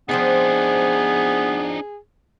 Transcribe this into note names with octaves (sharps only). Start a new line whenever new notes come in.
F3 B3 C4 D4 D#4 G#4 C5